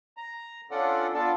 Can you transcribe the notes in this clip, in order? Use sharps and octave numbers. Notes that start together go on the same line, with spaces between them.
A#5
C#4 D4 F4 A4 D5 F#5
B3 D4 F4 A4 D5 A5